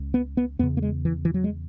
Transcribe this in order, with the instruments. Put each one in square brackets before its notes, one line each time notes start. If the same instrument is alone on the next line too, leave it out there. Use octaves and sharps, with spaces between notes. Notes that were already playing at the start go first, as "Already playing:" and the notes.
Already playing: [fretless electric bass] C#2 C#3
B3
B3
E2 C#3 B3
A#3
G#3
E3
E3
F#3
G#3